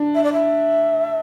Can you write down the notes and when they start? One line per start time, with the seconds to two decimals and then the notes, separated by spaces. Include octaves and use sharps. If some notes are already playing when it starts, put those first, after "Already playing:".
Already playing: D4
0.15 E5
0.23 D5
0.33 E5